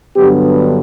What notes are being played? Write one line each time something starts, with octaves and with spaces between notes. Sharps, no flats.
G2 D3 F#3 B3 G4